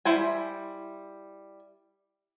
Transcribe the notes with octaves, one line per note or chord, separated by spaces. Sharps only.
G3 E4 C5 G#5